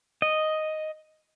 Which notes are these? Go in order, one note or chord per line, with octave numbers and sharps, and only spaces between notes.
D#5